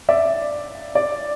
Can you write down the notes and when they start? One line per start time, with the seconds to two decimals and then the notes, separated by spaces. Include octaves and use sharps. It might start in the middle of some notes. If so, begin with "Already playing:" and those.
0.09 D5 E5
0.95 D5